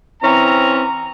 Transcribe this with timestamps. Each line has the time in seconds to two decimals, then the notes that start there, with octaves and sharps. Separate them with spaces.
0.22 E3 C4 C#4 A#5